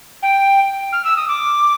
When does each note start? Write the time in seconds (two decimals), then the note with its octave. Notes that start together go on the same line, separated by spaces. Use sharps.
0.23 G5
0.93 F6
1.05 E6
1.17 D#6
1.28 D6